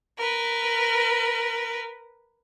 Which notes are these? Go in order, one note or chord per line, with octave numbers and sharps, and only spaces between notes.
A#4 B4